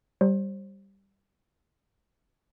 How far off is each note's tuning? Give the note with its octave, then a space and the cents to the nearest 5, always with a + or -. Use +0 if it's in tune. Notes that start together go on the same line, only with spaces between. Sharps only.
G3 +0 C5 +30